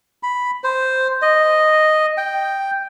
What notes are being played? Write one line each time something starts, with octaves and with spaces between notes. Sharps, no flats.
B5
C5
D#5
G5